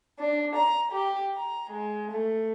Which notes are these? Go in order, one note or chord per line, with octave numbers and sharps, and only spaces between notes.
D4
A#5
G4
A#5
G#3
A3